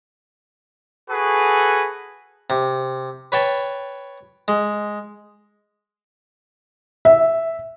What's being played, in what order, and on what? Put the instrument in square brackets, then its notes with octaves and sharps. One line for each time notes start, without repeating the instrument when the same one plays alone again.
[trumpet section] F#4 G#4 A4 B4
[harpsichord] C3
B4 C#5 G5 A5
G#3
[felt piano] E5